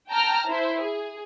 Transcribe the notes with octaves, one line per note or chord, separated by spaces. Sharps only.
G5 A5 A#5 F6
E4 C5
G#4